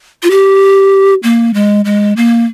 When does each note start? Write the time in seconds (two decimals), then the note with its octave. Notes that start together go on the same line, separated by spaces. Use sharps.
0.23 F4
0.30 G4
1.23 A#3
1.54 G#3
1.85 G#3
2.17 A#3